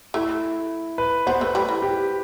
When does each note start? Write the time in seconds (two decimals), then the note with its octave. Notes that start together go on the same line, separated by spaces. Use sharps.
0.14 A3 E4
0.98 B4
1.27 B3 C5
1.41 A3 B4
1.55 G3
1.69 E3
1.82 G4